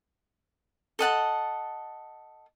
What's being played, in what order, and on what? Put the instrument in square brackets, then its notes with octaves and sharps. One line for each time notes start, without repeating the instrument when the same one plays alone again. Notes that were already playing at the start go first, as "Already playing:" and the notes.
[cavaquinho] A4 D#5 F#5 A5